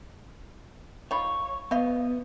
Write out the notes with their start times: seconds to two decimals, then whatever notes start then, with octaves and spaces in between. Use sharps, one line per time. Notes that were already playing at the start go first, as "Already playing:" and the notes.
1.11 D#4 F4 C#5 B5
1.71 B3 C5 D#5 F5